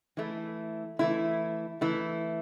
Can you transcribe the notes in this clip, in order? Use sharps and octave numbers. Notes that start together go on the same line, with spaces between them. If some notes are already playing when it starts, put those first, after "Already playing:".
E3 A3 E4
E3 A3 E4
E3 A3 E4